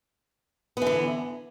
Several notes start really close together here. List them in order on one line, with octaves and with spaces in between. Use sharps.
B3 E3 D3